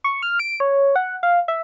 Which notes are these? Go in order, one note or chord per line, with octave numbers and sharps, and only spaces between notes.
C#6
F6
D7
C#5
F#5
F5
E5